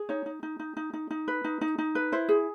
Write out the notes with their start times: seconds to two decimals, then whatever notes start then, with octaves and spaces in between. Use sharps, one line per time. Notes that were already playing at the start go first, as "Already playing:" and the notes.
Already playing: G#4
0.09 D#4 C#5
0.26 D#4
0.43 D#4
0.59 D#4
0.77 D#4
0.93 D#4
1.11 D#4
1.28 B4
1.44 D#4
1.61 D#4
1.78 D#4
1.95 B4
2.12 E4 C5
2.29 G#4